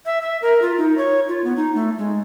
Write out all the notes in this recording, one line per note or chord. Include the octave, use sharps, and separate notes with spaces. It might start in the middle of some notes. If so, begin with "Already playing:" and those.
E5
E5
A#4
F4
D#4
C#5
F4
B3
D#4
A3
G#3